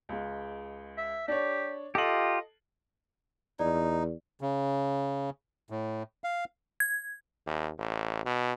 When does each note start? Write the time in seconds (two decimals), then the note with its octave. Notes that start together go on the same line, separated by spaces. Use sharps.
0.09 C#2 G#3
0.98 E5
1.28 D4 G4 C#5
1.95 F4 G4 A4 D#5 F#7
3.59 E2 D#4 D5
4.41 C#3
5.70 A2
6.24 F5
6.80 G#6
7.46 D#2
7.78 A1
8.25 B2